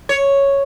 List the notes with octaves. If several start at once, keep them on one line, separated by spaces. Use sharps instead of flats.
C#5